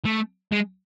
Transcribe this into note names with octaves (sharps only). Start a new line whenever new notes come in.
A3
G#3